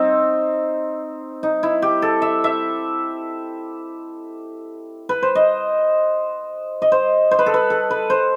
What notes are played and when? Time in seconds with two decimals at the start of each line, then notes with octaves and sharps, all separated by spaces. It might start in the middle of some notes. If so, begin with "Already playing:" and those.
Already playing: C4 D#4
1.43 D#4
1.63 E4
1.82 G4
2.02 A4
2.22 E5
2.44 E5
5.09 B4
5.23 C5
5.35 D#5
6.82 D#5
6.92 C5
7.31 C5
7.39 B4
7.46 A4
7.54 B4
7.70 A4
7.91 B4
8.10 C5